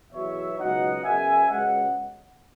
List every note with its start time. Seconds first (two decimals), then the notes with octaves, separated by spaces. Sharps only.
0.12 E2 B2 F#3 C#5 E5
0.57 C#2 B2 F#3 B3 D#4 D#5 F#5
1.04 F#2 C#3 F#3 B3 E5 G#5
1.49 C#2 B2 G#3 C#4 D#5 F#5